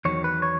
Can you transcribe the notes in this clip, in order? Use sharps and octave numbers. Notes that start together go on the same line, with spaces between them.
E2 D#3 F#3 C#5
B4
C#5